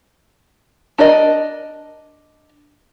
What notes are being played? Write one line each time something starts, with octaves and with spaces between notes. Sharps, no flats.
D4 A#4 D5 D#5